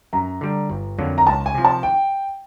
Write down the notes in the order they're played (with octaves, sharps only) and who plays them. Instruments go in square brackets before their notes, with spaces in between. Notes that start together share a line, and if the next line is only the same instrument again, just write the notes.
[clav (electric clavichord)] F#2 [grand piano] A#5
[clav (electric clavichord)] D3 G3
G1
F2 D3 F#3 A#3
[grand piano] A#5
[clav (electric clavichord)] C#2 [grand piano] A5
[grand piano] G#5
[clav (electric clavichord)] C3 F3
[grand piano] A5
G5